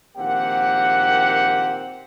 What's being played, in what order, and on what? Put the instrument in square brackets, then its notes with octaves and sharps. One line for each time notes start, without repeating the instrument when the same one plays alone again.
[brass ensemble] A#1 D#3 A#3 C4 G4 F#5